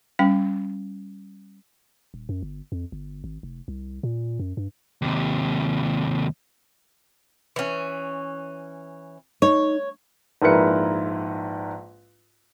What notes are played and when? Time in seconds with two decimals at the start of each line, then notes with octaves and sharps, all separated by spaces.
0.19 G3 C#4 G5
2.14 D#1
2.29 F#2
2.42 G1
2.72 F2
2.92 G1
3.24 G#1
3.43 F1
3.68 C2
4.03 A#2
4.40 F#2
4.57 G2
5.02 D#2 C3
7.56 E3 C#4
9.42 D#4 C#5
10.42 A#1 G#2 E4 A#4 B4 C#7